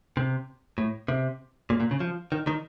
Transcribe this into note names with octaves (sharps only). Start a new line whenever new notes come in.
C3
A2
C3
A#2
A#2
C#3
F3
D#3
D#3